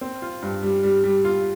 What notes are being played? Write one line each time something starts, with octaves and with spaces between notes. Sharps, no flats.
C4
F4
G2
G3
G3
G3
F4